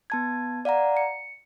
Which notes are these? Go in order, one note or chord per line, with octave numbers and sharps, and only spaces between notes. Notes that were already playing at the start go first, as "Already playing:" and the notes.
B3 A5 G#6
D5 F5 F#5 A#5
C#7